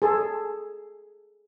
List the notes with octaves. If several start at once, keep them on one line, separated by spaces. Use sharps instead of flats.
G#4 A4